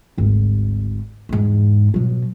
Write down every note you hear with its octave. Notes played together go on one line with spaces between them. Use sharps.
G#1 D2
E2 G#2
B2 F#3